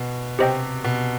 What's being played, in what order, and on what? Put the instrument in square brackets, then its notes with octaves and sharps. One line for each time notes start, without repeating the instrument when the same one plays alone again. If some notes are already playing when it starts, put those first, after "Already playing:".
Already playing: [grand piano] B2
[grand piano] C3 [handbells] G4 C5 D#5 G5
[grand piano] B2